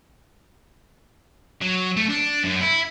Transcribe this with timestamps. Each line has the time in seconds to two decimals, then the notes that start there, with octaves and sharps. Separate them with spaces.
1.62 F#3
1.96 A3
2.09 D4
2.44 F#2
2.61 E4